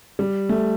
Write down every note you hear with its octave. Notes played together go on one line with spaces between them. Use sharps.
G3
A3